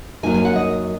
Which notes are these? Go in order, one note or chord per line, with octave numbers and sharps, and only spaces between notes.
F#2 F#3 A#3 D#4 G#5
G#5
F#5
D#5